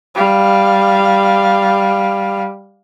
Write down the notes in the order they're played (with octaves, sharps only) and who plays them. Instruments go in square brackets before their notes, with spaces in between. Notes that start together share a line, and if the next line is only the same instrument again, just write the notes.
[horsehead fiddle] G3 F5